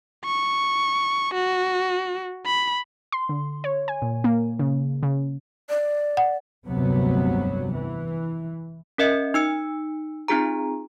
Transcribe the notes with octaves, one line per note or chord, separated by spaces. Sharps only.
C#6
F#4
B5
C6
D3
C#5
G#5
A#2
A#3
C#3
C#3
D5
F#5
F1 D2 G2 C3 F#3 B3
E3
C#4 A#4 D#5 E5 C#7
D#4 E6 C#7
C4 D#4 F4 G#4 A#5